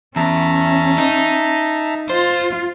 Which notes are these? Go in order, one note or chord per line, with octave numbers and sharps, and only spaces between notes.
E2 C#4 E5 A5 A#5
D#4
F4 C5